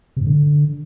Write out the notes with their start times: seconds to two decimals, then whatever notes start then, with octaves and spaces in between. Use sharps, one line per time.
0.17 C3
0.22 G#2
0.27 D3